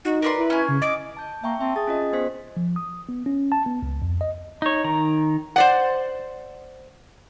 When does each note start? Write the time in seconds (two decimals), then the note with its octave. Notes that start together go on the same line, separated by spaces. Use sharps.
0.05 D#4 F#4
0.22 A#4 B4 D5 C6
0.38 E4
0.50 C#4 G#5
0.69 C#3
0.82 D#5 D6
1.17 A5 G6
1.44 A#3 E5 G5 C#6
1.61 C4 E5 A5
1.76 G#4 A6
1.87 C#4 F4 D#5
2.13 B3 C5 B6
2.57 F3
2.76 D#6
3.09 B3
3.26 C#4
3.52 A5
3.66 B3
3.82 C#2
4.02 F2
4.21 D#5
4.62 D#4 C#5
4.84 D#3 A#5
5.56 C5 D5 F#5